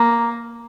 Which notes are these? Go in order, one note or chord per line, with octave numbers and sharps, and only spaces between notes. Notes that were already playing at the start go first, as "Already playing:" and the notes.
Already playing: A#3